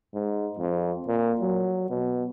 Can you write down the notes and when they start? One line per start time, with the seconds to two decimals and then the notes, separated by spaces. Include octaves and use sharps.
0.14 G#2
0.58 F2
1.08 A#2
1.41 F#3
1.90 B2